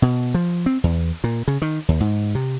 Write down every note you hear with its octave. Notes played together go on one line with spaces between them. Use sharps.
B2
F3
C4
E2
A#2
C#3
D#3
D#2
G#2
C3